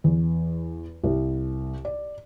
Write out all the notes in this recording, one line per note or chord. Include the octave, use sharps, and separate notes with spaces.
E2
C2
D5